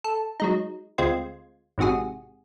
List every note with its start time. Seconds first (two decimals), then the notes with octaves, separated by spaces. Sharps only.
0.04 A4
0.40 F#3 G#3 D#4
0.98 D2 G#3 C4 F4 C6 G#6
1.78 A1 G#2 C3 F#4 G#4